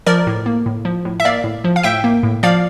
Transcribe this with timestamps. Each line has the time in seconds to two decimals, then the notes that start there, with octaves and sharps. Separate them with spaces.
0.06 F3 A#4 D5
0.27 A2
0.46 A#3
0.66 A2
0.85 F3
1.05 A2
1.20 E5
1.25 A#3 D5 F5
1.44 A2
1.64 F3
1.76 F5
1.83 A2 E5 G5
2.04 A#3
2.23 A2
2.43 F3 D5 F5